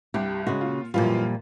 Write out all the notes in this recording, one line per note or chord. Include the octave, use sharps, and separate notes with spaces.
C2 G2 G4
C#3 G#3 F#4
A#2 F4
F#2 A#2 E3 F3 G3 F4